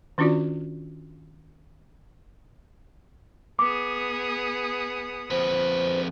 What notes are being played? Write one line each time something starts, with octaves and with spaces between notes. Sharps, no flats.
D#3 C#4 D4 F4 F#4 D5
B3 G#4 D6 D#6
F2 B4 C5